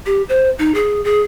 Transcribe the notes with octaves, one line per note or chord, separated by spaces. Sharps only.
G4
C5
D#4
G#4
G#4